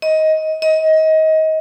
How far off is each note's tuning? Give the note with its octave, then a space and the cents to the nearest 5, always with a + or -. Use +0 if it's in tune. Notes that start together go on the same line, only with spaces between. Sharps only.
D#5 +15
D#5 +25